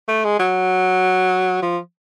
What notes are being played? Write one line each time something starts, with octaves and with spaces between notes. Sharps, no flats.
A3
G#3
F#3
F3